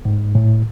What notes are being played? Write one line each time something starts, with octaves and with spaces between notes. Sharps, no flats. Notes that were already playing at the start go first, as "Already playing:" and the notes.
G#2
A2